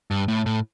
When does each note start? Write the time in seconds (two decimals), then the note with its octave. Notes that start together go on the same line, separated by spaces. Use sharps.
0.11 G2
0.28 A2
0.46 A2